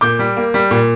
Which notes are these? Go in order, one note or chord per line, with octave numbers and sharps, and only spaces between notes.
A#2 D6 G6
G3
A#3
G3
A#2